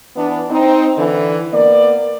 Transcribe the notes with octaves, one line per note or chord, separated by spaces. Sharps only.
E3 B3 D4
C4 D#4
D3 E3
A#3 B3 D5